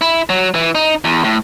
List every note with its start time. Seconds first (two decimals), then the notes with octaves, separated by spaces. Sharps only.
0.01 E4
0.30 F#3
0.55 E3
0.75 D#4
1.04 E2
1.25 A2